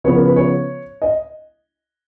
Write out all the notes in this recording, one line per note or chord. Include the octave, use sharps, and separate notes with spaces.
C#3 F3 B3 C#5
A#4
B4
C#5
D#5